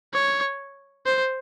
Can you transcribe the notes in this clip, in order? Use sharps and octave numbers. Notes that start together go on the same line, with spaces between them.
C#5
C5